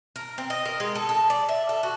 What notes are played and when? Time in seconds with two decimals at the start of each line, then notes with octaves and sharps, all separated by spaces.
0.16 A#4
0.38 C4
0.50 D#5
0.65 A#4
0.80 G#3
0.95 A4
1.09 A4
1.30 D5
1.49 E5
1.69 A4
1.83 F#4